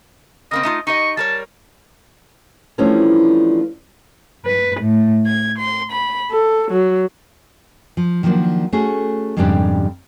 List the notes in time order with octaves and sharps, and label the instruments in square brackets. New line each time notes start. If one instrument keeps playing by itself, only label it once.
[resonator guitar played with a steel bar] C#3 A#3 C4 [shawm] D#5
[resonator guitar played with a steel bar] A3 D#4 F4
[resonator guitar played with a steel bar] D#4 G4 D#5 [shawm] C#6
[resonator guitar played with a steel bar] G3 A#4 C#5 [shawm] A5
[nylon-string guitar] E3 F3 G3 A3 C#4 D4
[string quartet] B4
A2
G#6
C6
B5
A4
F#3
[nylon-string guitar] F3
D#3 F3 F#3 A3 A#3 D4
A3 C#4 F#4 G#4
F2 G#2 C#3 G3 D4 G4